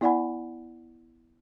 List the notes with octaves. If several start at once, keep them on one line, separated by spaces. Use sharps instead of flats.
B3 E4 D5 F#5 G#5 B5